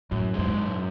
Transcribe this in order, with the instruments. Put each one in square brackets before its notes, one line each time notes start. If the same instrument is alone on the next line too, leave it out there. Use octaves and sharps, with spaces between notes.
[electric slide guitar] F#2 [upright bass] A2
[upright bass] G2 [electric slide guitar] G#3
[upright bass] G#2
[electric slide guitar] F#2